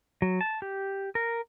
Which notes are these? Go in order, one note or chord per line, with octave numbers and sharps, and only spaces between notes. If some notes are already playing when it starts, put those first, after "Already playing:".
F#3
A5
G4
A#4